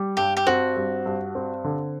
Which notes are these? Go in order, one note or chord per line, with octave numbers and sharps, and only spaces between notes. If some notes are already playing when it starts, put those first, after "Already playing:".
Already playing: G3
G2 G4
G4
C4 F#4
G2
G2
C4
D3